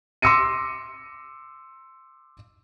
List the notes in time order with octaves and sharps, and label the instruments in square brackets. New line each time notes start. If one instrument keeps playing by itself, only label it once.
[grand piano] C6 D6 E6 A#6 C#7 D#7